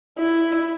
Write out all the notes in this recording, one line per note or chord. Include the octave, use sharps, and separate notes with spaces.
E4